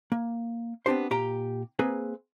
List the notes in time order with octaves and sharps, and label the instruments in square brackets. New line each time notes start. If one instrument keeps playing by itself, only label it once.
[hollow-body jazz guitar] A#3
B3 C4 D4 G4 C5
A#2 G4 G5 A#5
A#3 C4 G#4 B4